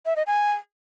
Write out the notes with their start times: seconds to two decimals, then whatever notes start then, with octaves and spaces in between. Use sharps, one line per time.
0.06 E5
0.16 D#5
0.27 G#5